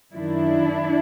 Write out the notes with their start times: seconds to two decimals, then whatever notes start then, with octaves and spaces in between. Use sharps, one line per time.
0.13 F#2 D#3 D4 E4